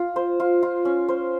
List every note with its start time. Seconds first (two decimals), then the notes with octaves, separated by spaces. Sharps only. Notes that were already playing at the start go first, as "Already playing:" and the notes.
Already playing: F4
0.16 C5
0.40 F4
0.63 F4
0.85 C#4
1.09 C5